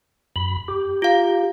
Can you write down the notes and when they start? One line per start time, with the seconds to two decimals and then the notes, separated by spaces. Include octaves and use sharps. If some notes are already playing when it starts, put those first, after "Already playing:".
0.36 F#2 B5
0.68 G4
1.02 F4 F5